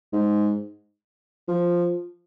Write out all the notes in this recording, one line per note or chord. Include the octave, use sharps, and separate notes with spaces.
G#2
F3